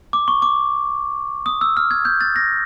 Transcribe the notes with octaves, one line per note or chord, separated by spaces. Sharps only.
D6
C#6
D6
D#6
E6
F6
G#6
G6
A6
A#6